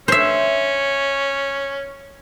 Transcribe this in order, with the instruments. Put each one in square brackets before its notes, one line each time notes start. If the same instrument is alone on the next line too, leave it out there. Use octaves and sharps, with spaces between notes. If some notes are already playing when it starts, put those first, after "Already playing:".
[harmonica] C#4 [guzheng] C5 E5